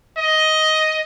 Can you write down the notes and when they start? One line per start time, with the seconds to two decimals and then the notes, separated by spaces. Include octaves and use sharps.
0.17 D#5